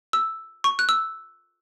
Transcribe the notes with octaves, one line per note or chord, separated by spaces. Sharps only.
E6
C#6
F#6
E6